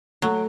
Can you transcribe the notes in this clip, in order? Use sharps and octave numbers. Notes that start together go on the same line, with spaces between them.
F#3 A3